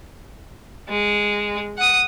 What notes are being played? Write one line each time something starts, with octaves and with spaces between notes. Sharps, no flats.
G#3
F#5 D#6